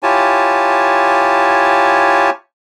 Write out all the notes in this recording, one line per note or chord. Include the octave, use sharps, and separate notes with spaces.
E4 F4 G4 C#5 G#5 A5